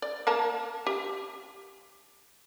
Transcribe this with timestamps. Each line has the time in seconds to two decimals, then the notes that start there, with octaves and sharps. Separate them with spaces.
0.02 D5
0.27 A#3 A#4 A5
0.87 G4